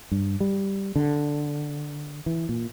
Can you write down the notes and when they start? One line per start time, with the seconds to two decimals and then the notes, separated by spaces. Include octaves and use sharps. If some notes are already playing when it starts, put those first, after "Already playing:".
0.12 G2
0.40 G3
0.96 D3
2.26 E3
2.49 A#2